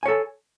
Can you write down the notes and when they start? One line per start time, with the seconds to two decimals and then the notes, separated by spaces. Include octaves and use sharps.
0.03 G#5
0.06 C#5
0.08 A4